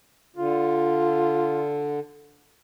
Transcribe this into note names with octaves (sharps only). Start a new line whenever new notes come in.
D3 F4